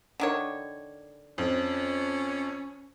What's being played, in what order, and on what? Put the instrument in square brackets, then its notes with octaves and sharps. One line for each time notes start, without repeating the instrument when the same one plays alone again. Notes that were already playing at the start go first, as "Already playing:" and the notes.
[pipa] D3 D#3 C#5
[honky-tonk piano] F2 [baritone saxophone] C#4